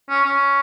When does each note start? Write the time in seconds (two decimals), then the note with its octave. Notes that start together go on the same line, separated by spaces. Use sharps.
0.09 C#4
0.25 C#4